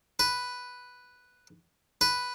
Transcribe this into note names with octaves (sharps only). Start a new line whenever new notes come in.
B4
B4